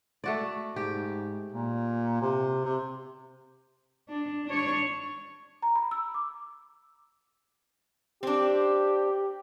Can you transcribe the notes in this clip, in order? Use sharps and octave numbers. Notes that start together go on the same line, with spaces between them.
A3 F#4 D5
G#2 G4
A#2
C3
C3
D4
D4 C#5
A#5
B5
E6
D6
C4 D4 G4